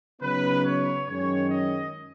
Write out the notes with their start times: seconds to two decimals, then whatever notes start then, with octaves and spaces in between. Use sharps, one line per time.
0.20 C#3 F#3 B3 D#4 B4
0.63 C#5
1.07 F#2 D#3 G#3 C#4 C#5
1.50 D#5